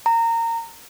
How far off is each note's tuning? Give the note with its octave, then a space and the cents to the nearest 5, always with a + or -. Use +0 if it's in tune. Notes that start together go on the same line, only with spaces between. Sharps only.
A#5 -20